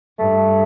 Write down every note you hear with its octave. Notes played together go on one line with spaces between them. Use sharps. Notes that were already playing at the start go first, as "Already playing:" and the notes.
G2 A3